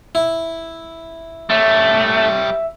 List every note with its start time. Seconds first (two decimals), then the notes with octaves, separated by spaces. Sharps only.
0.15 E4
1.50 G3 A3 C#5 E5